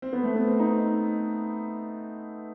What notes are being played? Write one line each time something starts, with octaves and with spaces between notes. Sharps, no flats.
C4
B3
A3
B3
C4
D#4